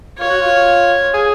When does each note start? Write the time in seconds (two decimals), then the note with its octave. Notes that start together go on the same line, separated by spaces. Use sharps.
0.19 F4 C#5
0.30 F#4
0.41 F4
1.14 G#4